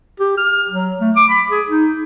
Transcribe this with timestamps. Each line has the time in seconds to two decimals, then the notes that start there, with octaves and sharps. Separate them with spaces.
0.20 G4
0.37 F6
0.69 F#3
1.01 A3
1.16 D6
1.30 B5
1.50 G#4
1.69 D#4